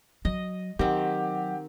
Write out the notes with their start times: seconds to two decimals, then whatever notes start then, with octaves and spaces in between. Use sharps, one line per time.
0.25 F#3 D#5
0.79 D#3 F#3 C4 G4 F#5